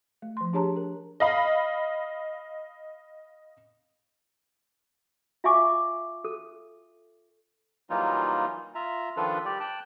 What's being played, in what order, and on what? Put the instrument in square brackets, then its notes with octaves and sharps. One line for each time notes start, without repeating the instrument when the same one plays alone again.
[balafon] A3
F3 C6
D4 G4 G#4 C#5 A5 A#5
A#4
[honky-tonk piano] D#5 F5 B5
[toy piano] F4 E5 F5 G#5 C#6 D6
A4
[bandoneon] E3 F#3 G3 A#3 D#4 F4
F4 E5 A#5
D#3 F3 D4 F4 A4 B4
G3 G4 D5
G5 A5 F#6